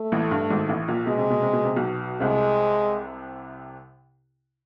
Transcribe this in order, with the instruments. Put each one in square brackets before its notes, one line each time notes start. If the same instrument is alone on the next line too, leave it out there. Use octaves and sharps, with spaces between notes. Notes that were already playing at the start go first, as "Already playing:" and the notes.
Already playing: [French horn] A3
[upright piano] A1 A2
G2
G#1 G#2
A1 A2
A#1 A#2
[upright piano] B2 [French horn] G#3
[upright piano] C3
B2
C3
B2
C3
B1 B2
[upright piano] C2 C3 [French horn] G#3